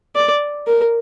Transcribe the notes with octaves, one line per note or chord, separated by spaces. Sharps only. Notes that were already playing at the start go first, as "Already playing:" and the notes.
D5
A#4